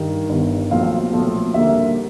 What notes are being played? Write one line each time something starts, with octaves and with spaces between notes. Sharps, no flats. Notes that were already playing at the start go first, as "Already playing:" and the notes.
Already playing: G2 D#3
G1 G2 D#3
B1 A#2 F3 A3 C4 F5
B1 A#2 F3 A3 C4
D#2 D3 G3 A#3 E5